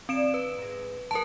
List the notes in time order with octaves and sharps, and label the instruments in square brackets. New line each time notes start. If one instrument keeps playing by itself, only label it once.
[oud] D#3 D4 D5 [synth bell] C4 D7 E7
[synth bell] B4
[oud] G#2 G#3
[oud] F#3 B3 G#4 [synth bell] A#4 A5